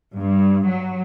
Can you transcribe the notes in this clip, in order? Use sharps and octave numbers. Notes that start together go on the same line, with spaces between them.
G2
F#3